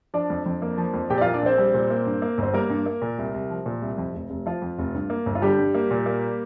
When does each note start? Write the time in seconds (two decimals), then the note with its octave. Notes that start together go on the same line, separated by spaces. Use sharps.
0.14 F3 D4 D5
0.30 F2
0.46 F2
0.62 A#3
0.78 F3
0.94 F2
1.10 A#2 G4 G5
1.18 D5
1.21 A#3 F4 F5
1.34 D4 D5
1.42 A#1 C4 C5
1.58 G3
1.74 A#2
1.90 A#3
2.06 G2
2.22 A#3
2.38 G1 C5
2.53 G3 A#3 A#4
2.70 G2
2.86 A#3
3.02 A#2
3.18 C2
3.34 C2
3.50 F3
3.66 A#2
3.82 C2
3.98 F2
4.14 F1
4.30 F1
4.46 F3 F4
4.62 F2
4.79 F1
4.94 G2
5.10 A#3
5.26 G1
5.35 F4
5.42 D3 G3 G4
5.59 G2
5.74 A#3
5.91 A#2
6.06 A#3